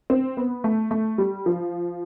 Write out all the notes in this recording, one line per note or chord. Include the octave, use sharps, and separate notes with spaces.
C4
B3
A3
A3
G3
F3